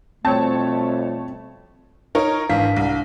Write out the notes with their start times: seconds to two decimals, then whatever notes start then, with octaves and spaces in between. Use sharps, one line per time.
0.25 F2 B2 G3 A3 C4 C#5 A5
2.15 D#4 A#4 C#5
2.49 G#1 E3 D4 F5 B6
2.76 C2